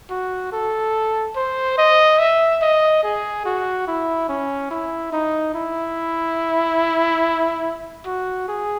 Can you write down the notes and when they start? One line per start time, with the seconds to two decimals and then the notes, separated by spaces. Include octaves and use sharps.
0.10 F#4
0.52 A4
1.36 C5
1.78 D#5
2.19 E5
2.62 D#5
3.03 G#4
3.45 F#4
3.87 E4
4.29 C#4
4.71 E4
5.13 D#4
5.55 E4
8.06 F#4
8.48 G#4